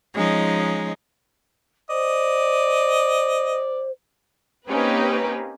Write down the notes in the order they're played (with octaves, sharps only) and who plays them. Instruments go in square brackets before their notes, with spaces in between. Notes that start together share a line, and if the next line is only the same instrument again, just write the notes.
[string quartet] F3 G#3 C#4 D#4
[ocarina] C5 [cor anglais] D5 [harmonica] D#5
[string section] A#3 C4 C#4 D#4 G4 B4